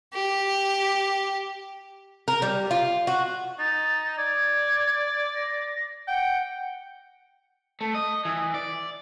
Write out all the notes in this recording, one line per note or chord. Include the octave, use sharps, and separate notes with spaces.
G4
A#4
G3
F4
F#4
D#4 A6
D5 G#6
A#6
F#5 G5
A3
D#5
E3
D5